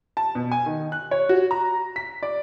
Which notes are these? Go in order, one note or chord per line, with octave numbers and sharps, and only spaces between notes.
A5
B2
G#5
D#3
F#6
C#5
F#4
A#5
B6
D5